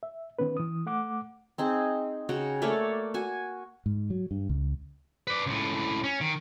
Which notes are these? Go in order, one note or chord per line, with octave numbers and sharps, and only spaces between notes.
E5
D#3 B3 C#4 B4
E3 D#6
A3 F#5 D6
C4 D#4 G#4
C#3 F#4 G5 A#5
A3 A#3 C#5 D5
F#4 G#5
G#2
F#3
G2
C#2
B4 D5
C#2 A2
C#4
D#3